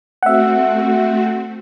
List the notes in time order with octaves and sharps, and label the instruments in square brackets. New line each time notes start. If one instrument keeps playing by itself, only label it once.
[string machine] A3 C4 F#4 [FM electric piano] E5 F#5